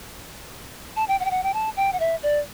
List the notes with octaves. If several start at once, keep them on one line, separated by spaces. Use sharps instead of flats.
A5
G5
F#5
G5
F#5
G5
A5
G5
F#5
E5
D5